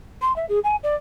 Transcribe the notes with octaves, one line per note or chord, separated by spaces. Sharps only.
C6
E5
G#4
G#5
D5